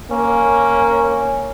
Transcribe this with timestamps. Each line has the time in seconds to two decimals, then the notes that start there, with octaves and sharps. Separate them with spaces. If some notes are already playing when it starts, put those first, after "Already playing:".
0.11 A#3 C#4